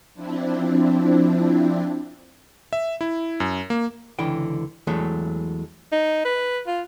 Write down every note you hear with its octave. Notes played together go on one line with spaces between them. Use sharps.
F3 C4 D4 E4
E5
E4
F#2
A#3
C#2 D3 E3 G5
E2 E3 F#3 G#3 A3
D#4
B4
F4